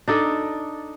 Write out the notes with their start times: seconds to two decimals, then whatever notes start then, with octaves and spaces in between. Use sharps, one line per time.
0.08 D4 D#4 A4 D5